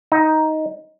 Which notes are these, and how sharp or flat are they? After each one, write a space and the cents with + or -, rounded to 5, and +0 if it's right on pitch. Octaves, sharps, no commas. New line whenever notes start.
D#4 +10